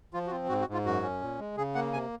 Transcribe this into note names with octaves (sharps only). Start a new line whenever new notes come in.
F3 F4
F#4
C4 F4
G#2 F#4
F#4
G#2
F4
F#2 F#4
C#4
A#2
G#3
C#3 G#4
A#3 F#5
C3 G#5